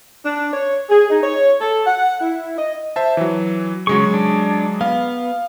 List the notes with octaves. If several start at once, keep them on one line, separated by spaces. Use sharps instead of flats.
D4
C#5
G#4
D#4
C#5
A4
F#5
E4
D#5
C5 E5 A5
E3 F#3
C#3 F#3 G#3 G#4 C#6
D4
B3 F5